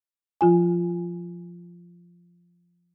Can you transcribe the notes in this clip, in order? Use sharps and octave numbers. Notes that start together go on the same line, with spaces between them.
F3 F4 G#5